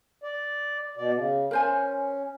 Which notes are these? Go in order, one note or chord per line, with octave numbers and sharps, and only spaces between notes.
D5
B2 D5
C#3
C#4 A#4 C5 G#5